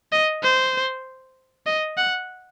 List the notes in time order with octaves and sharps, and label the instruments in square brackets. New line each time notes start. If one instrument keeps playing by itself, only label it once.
[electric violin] D#5
C5
D#5
F#5